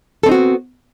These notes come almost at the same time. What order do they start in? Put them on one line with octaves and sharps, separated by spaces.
A4 C4 D#4 F#4 B3